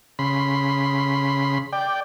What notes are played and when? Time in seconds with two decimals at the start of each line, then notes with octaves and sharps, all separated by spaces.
0.19 C#3 B5 C6
1.72 D5 G5